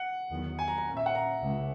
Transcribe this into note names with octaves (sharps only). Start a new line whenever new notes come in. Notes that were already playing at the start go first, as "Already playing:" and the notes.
Already playing: F#5
E2 D#3 F#3 B3
G#5
A#5
A#5
A#2 A#3 C#4
E5
F#5
A#5
C#2